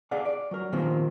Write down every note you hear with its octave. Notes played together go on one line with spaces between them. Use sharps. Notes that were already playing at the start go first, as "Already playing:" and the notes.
G#4 D5 F5 F#5
D5
F#3 A#4
A#2 D#3 F3 A#3 C4